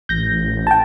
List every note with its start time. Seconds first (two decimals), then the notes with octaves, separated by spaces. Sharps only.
0.09 A1 G6 A#6
0.67 G5 A5